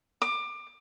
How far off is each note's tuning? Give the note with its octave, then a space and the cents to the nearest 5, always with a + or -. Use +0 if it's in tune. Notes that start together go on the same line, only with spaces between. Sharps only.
D6 +25